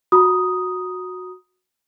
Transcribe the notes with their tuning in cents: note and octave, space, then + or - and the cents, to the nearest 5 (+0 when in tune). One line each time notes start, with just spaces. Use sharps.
F#4 -15 A#5 +25 D#6 +0